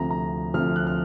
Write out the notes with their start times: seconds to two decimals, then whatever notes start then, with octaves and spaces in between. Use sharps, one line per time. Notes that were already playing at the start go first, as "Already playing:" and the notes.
Already playing: D2 C3 F3 A#5
0.11 A#5
0.54 D2 C3 F3 F6
0.76 F#6
0.87 F6